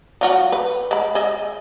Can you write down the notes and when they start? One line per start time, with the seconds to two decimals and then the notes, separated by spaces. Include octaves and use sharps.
0.21 F#3 F4 F#4
0.52 B4
0.91 G#3 B5
1.15 G#4 D#5 E5